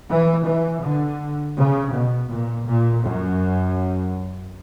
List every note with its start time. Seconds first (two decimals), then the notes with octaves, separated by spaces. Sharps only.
0.10 E3
0.47 E3
0.83 D3
1.57 C#3
1.92 B2
2.29 A#2
2.66 A#2
3.02 F#2